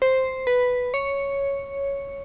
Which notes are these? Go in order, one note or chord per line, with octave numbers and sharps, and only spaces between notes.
C5
B4
C#5